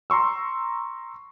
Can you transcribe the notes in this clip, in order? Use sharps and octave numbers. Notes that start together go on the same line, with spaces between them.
A#5 C6 C#6 E6